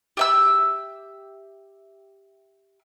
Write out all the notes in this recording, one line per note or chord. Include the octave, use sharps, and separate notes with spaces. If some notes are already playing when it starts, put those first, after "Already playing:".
G4 E5 E6